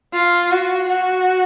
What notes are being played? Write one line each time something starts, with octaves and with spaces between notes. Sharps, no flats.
F4
F#4
F#4